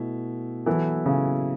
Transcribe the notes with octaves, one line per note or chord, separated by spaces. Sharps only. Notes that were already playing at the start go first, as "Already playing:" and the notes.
Already playing: B2 A3 E4
E3 F#3 B3 E4 A4
C#3